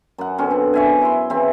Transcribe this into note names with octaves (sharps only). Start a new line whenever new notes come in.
F#2 F#5
B2 D3 C4 C#4
D4
C#5 E5 G#5
E4 C6
C#3 E3 C4